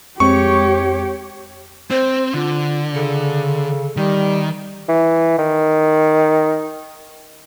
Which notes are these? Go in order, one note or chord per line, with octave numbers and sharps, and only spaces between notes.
F2 G#3 C4 G4 C#5 C#6
C4 C5
D3 F4
C#3 A4
D#3 G3 G4
E3
D#3